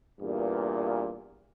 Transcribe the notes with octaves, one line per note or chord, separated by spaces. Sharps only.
E2 G2 A#2